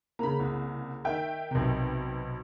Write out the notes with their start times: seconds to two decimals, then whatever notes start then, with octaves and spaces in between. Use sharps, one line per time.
0.19 C#3 A#3 A#5 B5
0.39 C2
1.05 D#3 E5 G5
1.51 B1 C3